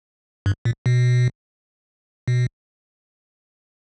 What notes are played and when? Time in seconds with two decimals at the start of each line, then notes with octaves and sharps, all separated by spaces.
0.46 G2
0.65 A#2
0.86 B2
2.28 B2